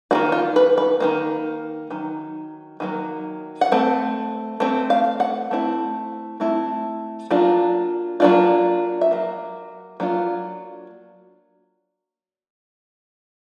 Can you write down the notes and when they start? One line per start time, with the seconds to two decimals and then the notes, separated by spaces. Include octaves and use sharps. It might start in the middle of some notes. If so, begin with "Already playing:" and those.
0.11 D#3 F#3 A#3 F#4
0.32 F4
0.56 B4
0.78 B4
1.00 D#3 F#3 A#3
1.90 D#3 F#3
2.80 D#3 F#3 A#3
3.61 F#5
3.72 A3 C4
4.60 A3 C4
4.90 F5
5.20 F#5
5.51 A3 C4 E4
6.40 A3 C4 E4
7.31 F#3 A#3 D4 F4
8.20 F#3 A#3 D4 F4
9.01 E5
9.11 F#3 A#3
10.00 F#3 A#3 D4 F4